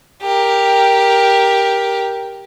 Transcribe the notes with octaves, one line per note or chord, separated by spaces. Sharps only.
G4 A#4